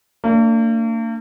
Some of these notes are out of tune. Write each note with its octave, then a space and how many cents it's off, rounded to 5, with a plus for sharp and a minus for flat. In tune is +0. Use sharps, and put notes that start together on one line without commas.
A#3 -45 D4 +0